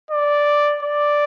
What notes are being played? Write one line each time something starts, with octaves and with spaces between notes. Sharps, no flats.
D5
D5